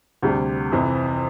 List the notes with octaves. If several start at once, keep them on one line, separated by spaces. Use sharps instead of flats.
D2 C3 G3
F2 C3 E3